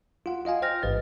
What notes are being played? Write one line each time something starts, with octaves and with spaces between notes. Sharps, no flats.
F4 F#5
F4 D#5 F5 G#5
C5 G5 F6 A#6
A1 G#2 B4 D#5 A6